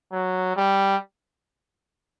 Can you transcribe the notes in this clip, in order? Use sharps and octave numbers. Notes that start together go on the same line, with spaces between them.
F#3
G3